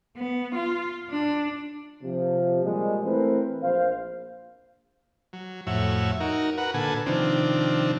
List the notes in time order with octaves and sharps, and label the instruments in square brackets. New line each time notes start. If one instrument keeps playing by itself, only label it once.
[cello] B3
F4
D4
[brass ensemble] C3 F3
A#2 G3 G#3
E3 A3 C4 A#4 B4
A#1 C5 F5
[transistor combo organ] F#3
F2 A2 F#4 C#5 E5
D#4 F#4 A#4
F#4 A#4 B4 F#5
A#2 D3 A4 B4 G#5
C3 D#3 F3 C4 D4